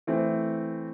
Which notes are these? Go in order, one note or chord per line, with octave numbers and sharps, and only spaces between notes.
E3 A3 C4